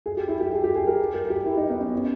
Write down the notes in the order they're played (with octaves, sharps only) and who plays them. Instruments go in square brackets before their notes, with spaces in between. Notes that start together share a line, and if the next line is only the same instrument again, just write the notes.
[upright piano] G#4
G4
E4
G4
G#4
G4
G#4
A#4
A#4
G4
E4
D#4
B3
C#4
C#4